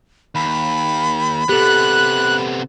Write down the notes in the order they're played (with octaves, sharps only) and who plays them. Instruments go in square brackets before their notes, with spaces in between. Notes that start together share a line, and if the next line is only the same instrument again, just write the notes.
[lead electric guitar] D#2 [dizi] B5
[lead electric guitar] C3 B3 [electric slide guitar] G4 A4 [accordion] F#6